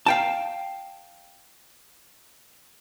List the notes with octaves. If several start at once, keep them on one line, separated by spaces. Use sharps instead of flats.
F5 G5 A5